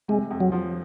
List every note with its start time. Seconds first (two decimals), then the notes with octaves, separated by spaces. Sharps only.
0.08 C3 G#3
0.31 F2
0.40 F#3
0.52 F3